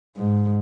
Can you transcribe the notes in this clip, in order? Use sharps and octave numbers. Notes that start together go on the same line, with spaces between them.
G#2